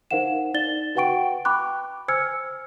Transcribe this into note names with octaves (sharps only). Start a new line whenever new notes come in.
D#4 A#4 C5 F5 F#5 E7
D#4 D5 A6 G7
F#4 B4 F#5 G5 C#6 D7
G5 B5 C#6 D6 F#6
C5 G#5 E6 F6 G#6 C#7